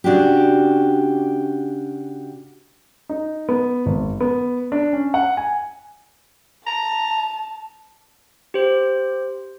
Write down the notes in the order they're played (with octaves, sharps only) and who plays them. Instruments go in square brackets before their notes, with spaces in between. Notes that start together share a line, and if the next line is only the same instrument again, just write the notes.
[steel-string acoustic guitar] C#3 D4 F#4 G4
[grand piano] D#4
B3
G#1
B3
D4
C#4
F#5
G#5
[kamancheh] A5 [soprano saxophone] A#5
[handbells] G4 C5